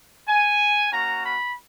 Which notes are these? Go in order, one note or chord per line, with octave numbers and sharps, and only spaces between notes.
G#5
A#3 C#4 F#4 A#5
B5